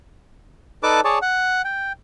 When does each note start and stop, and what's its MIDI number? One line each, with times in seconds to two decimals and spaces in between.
0.83 1.01 63
0.83 1.01 69
0.83 1.01 71
0.83 1.01 74
0.83 1.01 81
0.83 1.01 86
1.05 1.19 68
1.05 1.19 73
1.05 1.19 74
1.05 1.19 81
1.22 1.62 78
1.64 1.92 79